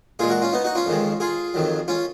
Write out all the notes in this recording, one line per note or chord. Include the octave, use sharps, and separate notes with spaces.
A#2 G#3 F4 G#4
F#4 A#4
C#4 F4
B3 D#4
D#4 F#4
C#4 F4
F2 D#3 G#3
F4 G#4
F2 D#3 F#3
C#4 F4